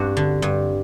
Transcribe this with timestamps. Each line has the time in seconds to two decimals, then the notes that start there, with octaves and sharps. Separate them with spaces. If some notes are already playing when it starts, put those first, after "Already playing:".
Already playing: G2 C4 D4 F#4
0.17 D3
0.42 G2